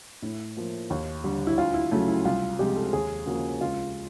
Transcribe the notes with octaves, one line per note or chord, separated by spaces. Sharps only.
A2 E4
F3 A#3
D#2
D3 G3
E4
D2 F4
E4
C#3 F#3 A3
E4
C2 F4
C3 F3 G#3 G4
A4
D#2 G#4
C#3 F3 A#3 F#4
C#2 F4